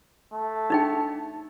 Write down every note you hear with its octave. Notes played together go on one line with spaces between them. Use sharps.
A3
D4 D#4 G5